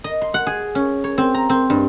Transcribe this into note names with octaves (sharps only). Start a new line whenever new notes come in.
D#5
C6
F#5
G#4
C#4
C#5
C4
A#5
C4
G2